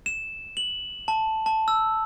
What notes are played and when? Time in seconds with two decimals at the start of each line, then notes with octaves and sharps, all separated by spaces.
0.06 E7
0.57 F#7
1.08 A5
1.46 A5
1.68 E6